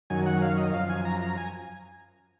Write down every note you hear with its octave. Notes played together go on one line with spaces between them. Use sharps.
F#2 D#3 F#3 G#5
F#5
F5
D#5
F#2 F3 F5
G#5
A#5
A#5
G#5